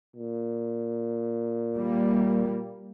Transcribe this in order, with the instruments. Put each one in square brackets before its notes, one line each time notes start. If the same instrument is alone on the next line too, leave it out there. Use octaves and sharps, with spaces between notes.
[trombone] A#2
[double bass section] G3 A#3